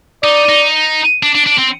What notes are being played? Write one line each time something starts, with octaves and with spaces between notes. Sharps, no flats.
D#4 D5
D#4
D4
D4
D4
C4